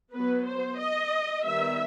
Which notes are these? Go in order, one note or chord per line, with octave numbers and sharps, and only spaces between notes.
F#3 B3 B4
C5
D#5
D#3 G3 B3 E5